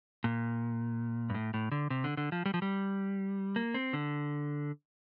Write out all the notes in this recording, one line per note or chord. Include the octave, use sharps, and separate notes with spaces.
A#2
G2
A2
A2
D3
C3
D3
D3
F3
G3
F3
G3
A#3
C4
D3